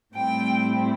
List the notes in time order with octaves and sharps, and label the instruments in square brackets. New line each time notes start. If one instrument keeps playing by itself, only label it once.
[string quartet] A2 G3 C4 E4 G5